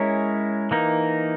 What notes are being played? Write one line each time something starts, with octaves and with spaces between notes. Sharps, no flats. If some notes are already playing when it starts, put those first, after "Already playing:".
Already playing: G#3 C#4 E4 A#4 C#5
E3 A#3 D#4